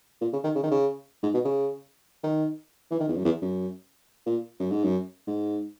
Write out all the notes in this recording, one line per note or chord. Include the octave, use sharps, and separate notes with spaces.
A#2
C#3
D#3
C#3
D#3
C#3
G#2
B2
C#3
D#3
E3
D#3
E2
F#2
E2
F#2
A#2
F#2
G#2
F#2
G#2